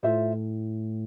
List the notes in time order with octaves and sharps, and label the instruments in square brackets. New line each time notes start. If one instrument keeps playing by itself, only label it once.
[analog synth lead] A2 [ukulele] F4 A4 C5 E5